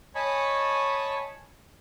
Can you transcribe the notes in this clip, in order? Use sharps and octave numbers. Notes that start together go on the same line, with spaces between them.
C#5 D#5 G#5 A5 B5 C#6